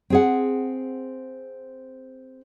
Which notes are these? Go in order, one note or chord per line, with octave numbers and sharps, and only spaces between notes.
C4 G#4 F#5